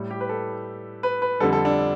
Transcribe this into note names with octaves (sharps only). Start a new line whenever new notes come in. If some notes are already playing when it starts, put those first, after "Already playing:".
Already playing: A2 G3
G4
B4
A4
B4
B4
F2 D3 G3 A4
A4
D4